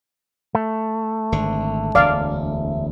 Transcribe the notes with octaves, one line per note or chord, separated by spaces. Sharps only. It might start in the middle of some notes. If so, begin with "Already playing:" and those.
A3
G#1 D3
E1 D2 D5 F5